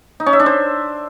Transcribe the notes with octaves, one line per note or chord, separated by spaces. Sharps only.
D#4
C#4
E5
D4
C5